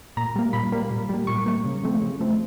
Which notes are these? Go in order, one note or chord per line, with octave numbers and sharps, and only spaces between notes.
A#2 A#5
G3 A#3
A#2 B5
G3 A#3
A#2
G3 A#3
A#2 C#6
G3 A#3
C#3
F3 A3 C4
C#3
F3 A3 C4